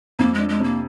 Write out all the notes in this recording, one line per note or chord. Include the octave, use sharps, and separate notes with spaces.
F2 A#3
G#3 D4
G#3
C3 A#3